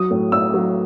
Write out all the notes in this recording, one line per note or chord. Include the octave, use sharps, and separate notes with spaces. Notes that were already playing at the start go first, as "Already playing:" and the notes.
Already playing: F#3 D#6
A2
A2 E6
F#3